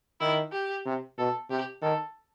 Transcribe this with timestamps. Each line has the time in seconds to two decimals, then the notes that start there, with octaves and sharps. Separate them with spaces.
0.20 D#3 E4
0.52 G4
0.86 C3
1.18 B2 A4
1.50 C3 G4
1.82 D#3 A4